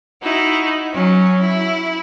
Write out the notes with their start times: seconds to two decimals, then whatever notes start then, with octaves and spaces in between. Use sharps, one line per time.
0.21 D#4 E4 F#4
0.92 F#3 C#4
1.41 E4